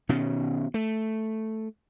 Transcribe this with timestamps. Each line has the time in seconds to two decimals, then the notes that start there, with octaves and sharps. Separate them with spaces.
0.09 B2 D#3 C#4
0.74 A3